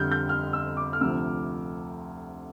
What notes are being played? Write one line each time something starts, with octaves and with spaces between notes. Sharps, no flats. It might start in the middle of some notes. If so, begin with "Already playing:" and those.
Already playing: F2 D3 G3 F6 G6
G6
F6
E6
D6
F6
D2 C3 F3 E6